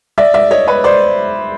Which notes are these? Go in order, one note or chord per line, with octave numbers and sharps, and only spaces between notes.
D5 E5
D5 E5
C#5 D#5
B4 C#5
C5 D5